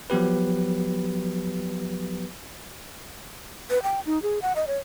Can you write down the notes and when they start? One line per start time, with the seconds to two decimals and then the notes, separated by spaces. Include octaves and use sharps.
0.10 F3 F#3 B3 G4 B4
3.70 B4
3.83 G5
4.06 D#4
4.22 G#4
4.42 F#5
4.56 D#5
4.67 C#5